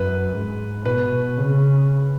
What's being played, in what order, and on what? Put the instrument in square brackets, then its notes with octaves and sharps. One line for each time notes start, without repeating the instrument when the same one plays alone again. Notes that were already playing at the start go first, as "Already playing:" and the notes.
Already playing: [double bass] F#2 [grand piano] B4
[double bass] G#2
[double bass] B2 [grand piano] B4
[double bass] C#3